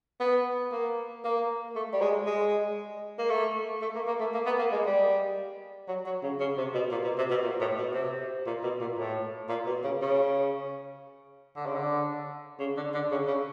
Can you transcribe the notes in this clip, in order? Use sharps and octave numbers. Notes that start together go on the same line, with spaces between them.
B3
A#3
A#3
A3
G3
G#3
G#3
A#3
A3
A3
A#3
A#3
A3
A#3
B3
A#3
G#3
G3
F#3
F#3
C#3
C#3
C3
B2
A#2
B2
C3
B2
A#2
A2
B2
C3
A#2
B2
A#2
A2
A#2
B2
C#3
C#3
D3
C#3
D3
C#3
D3
D3
C#3
C#3